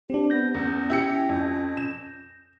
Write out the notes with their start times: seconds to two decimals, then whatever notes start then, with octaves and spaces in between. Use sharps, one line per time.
0.10 C4 D4 G4
0.30 B3 G6 A#6
0.54 E2 C#4
0.90 E4 G4 C#7
1.29 F2
1.77 E7